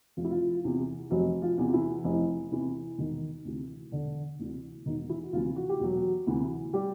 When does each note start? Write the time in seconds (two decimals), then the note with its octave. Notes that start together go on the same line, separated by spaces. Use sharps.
0.17 F1 F4
0.25 E4
0.31 F3 F4
0.64 E2 C3 E3
1.10 F1 F#3 F#4
1.42 F3 F4
1.58 E2 C3 E3
1.73 E3 E4
2.04 F1
2.51 E2 C3 E3
2.98 E1 D#3 D#4
3.45 D2 C3 E3
3.91 E1 D3 D4
4.39 D2 C3 E3
4.86 E1 D#3 D#4
5.09 E3 E4
5.23 F#4
5.33 D2 C3 E3 F3 F4
5.56 F#4
5.69 G4
5.80 E1 F#3 F#4
6.27 D2 C3 E3
6.73 G3 G4